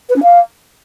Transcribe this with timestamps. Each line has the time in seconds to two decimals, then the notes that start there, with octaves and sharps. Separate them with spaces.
0.09 B4
0.16 C#4
0.23 F5